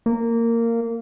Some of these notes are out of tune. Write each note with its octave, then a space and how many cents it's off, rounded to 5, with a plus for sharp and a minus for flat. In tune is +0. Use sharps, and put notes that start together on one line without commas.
A#3 -15